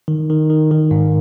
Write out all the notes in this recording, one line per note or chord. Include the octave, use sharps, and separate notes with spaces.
D#3
D#3
D#3
D#3
G#2